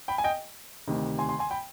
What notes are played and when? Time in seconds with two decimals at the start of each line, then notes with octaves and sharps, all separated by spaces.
0.08 G5 B5
0.18 G#5
0.24 D#5 G5
0.87 D2 C3 D#3
1.19 G#5 C6
1.29 G#5 C6
1.39 G#5 C6
1.50 G5 B5